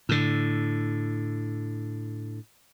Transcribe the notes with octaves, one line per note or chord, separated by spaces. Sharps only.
A2 D3